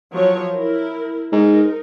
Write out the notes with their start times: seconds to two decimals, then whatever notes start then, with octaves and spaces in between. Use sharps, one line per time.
0.13 F3 F#3 C#5
0.54 E4 A#4
1.32 G#2 D#4 A#4